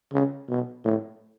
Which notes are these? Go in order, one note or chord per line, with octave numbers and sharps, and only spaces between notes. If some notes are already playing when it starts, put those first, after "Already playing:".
C#3
B2
A2